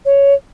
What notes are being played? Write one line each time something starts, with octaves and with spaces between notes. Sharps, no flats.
C#5